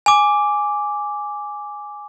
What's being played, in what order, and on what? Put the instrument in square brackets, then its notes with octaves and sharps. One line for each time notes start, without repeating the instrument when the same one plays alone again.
[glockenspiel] G#5 D6